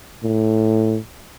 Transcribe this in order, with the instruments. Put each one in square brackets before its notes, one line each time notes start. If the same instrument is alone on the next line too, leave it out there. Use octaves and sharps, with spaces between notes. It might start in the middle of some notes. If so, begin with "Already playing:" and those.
[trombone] A2